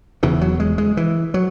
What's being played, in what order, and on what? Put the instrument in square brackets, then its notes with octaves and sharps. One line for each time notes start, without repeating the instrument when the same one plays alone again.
[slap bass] E1 E2 C#3 E3
F#3
G#3
G#3
E3
F#3